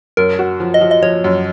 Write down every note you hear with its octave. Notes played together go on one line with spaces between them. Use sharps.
F#2 A#4
F#4
F3
D#5
F3
D#5
F3 C#5
F#2